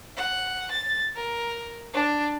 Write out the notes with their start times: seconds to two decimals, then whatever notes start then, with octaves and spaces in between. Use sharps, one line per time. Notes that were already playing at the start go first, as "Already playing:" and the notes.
0.17 F#5
0.72 A6
1.16 A#4
1.95 D4